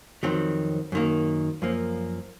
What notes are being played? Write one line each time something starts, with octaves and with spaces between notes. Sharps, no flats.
F2 D#3 F#3 C4
F#2 D#3 A#3
F#2 F3 A#3